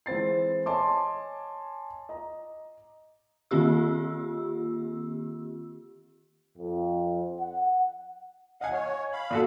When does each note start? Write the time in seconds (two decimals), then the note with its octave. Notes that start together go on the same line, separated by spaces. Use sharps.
0.06 E3 G#3 C4 A6 C7
0.66 C#5 D#5 G#5 A5 C6 D6
2.09 D#5 A#5
3.51 D#3 A#3 C4 F4 G4 E6
6.58 F2
7.40 F#5
8.61 D#5 F5 F#5 G#5
8.73 C#5
9.12 F5 B5
9.30 A#2 F#4 A4